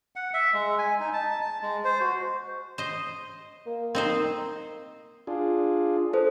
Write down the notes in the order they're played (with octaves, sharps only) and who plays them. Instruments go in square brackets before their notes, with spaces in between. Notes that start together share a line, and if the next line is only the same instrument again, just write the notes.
[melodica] F#5
E5
G#3
G#5
D#4
A5
A5
G#3
C5
F#4
[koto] C5 D#5
[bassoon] A#3
[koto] C4 D#4 C5
[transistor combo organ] D4 F4 G#4
[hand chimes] A4 C5